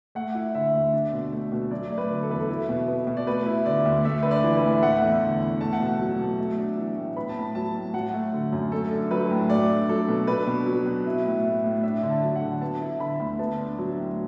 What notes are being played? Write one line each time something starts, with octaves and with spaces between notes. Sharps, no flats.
A3 F#5
E4
D3 E5
D2
D4
B2
A3
B2
F#3 D5
A3 D5
B4
D3
A4
E2 B4
A4
E4
B2
B3
B2
D5
A3 B4
E4
D3 D5
D2
A3 E5
D4 B4
D5
E3
B4
A2
E5
A3 F#5
E2
D3
E2
A3 A5
F#5
B2
A5
F#3
B2
A3
D4
E3
A2
B3 B5
A5
A2
B5
F#3 A5
A2
F#3 F#5
A3
D3
F#2
A3 A4
D4
F#3 B4
A2
A3 D5
D4
F#3 A4
B2
D4 B4
B2
F#3
B2
E4
A2
A3
A2
D4 E5
D3
A5
F#3
F#5
D3
B3 A5
E4
D3 B5
D2
B3 A5
D4
F#3
A2